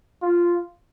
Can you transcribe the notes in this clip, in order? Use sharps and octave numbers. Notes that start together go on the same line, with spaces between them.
F4